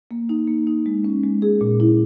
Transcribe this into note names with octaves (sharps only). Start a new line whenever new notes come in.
A#3
D#4
A#3
D#4
G#3
C#4
G#3
G#4
A#2
E4